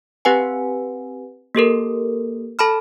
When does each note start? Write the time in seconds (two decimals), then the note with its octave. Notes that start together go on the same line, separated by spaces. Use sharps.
0.25 C4 G4 B4 F#5 G#5
1.55 A#3 G4 A4 A#4
2.59 A4 A5 B5 F6